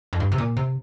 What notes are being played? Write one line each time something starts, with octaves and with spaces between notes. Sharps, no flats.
F2
G2
C3
A#2
C3